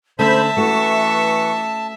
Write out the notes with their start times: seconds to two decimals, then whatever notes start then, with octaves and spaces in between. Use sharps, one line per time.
0.19 D3 A3 C#4 C5 E5 A5 B5
0.57 E3 A3 C#4 F#4 C#6